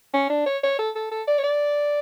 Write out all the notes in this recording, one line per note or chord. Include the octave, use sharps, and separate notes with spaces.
C#4
D4
C#5
C#5
A4
A4
A4
D5
C#5
D5